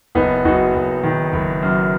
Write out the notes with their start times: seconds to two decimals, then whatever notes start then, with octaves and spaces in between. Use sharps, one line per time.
0.15 F#1 B3 D#4
0.45 F#1 D#4 F#4
0.74 F#1
1.03 D#3
1.33 F#1
1.63 F#2